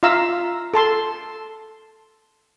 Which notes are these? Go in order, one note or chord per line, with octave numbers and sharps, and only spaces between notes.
F4 E5 F5 A#5 E6
A4 A5 C6